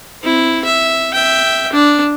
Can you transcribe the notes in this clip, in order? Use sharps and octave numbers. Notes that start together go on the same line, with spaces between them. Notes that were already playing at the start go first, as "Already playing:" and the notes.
C4 E4
E5
E5 G5
D4